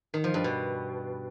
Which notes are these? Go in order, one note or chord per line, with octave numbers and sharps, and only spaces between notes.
D#3
F3
G2
B2